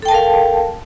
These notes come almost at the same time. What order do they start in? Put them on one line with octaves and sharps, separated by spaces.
A4 G5 A5 A#4 F5